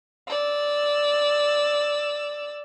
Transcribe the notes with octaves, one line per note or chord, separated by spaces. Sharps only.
D5 E6